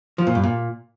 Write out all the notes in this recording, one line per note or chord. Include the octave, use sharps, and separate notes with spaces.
F3
A#2
G2
A#2